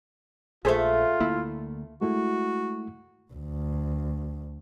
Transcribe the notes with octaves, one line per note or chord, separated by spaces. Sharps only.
A#1 A3 F4 G#4 A4 C5 E5
D2 A#3 E4
G#3 A3 E4 F#4
D2